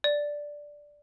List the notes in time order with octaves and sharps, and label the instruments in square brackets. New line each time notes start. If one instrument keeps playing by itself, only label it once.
[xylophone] D5